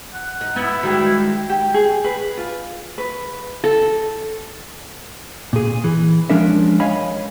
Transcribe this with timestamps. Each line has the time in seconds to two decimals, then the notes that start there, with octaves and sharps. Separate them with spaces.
0.14 F#5
0.41 D#4
0.56 B3 E4
0.83 D#3 G3 G#3 F#4
1.49 G4
1.74 G#4
2.04 B4
2.38 F4
2.98 B4
3.64 A4
5.53 A#2 G#4
5.84 E3
6.30 F3 G#3 C#4 D4 A#4 E5
6.80 C#5 D#5 F5 G#5 B5